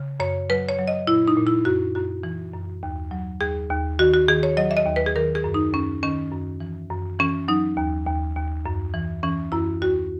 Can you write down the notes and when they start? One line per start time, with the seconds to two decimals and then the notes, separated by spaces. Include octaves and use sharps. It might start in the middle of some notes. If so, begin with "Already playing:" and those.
Already playing: C#3
0.20 F#2 C#5
0.50 F#3 B4
0.69 C#5
0.79 F#3
0.88 D#5
1.07 A#2 E4
1.28 D#4
1.37 A#2
1.47 E4
1.65 F#2 F#4
1.95 F#2 F#4
2.23 E3
2.53 F#2
2.83 D#2
3.11 F#3
3.41 D#2 G#4
3.70 D#2
3.99 D#3 F#4
4.14 F#4
4.28 D#3 G#4
4.43 C#5
4.57 F#3 D#5
4.71 E5
4.77 D#5
4.86 D#2
4.96 B4
5.06 G#4
5.16 D#3 A#4
5.35 G#4
5.44 F#2
5.54 D#4
5.74 F#2 C#4
6.03 D#3 C#4
6.32 F#2
6.60 E3
6.91 F#2
7.19 E3 C#4
7.48 F#3 D#4
7.77 D#2
8.07 D#2
8.36 D#2
8.66 F#2
8.94 E3
9.23 E3 C#4
9.52 F#2 E4
9.82 D#2 F#4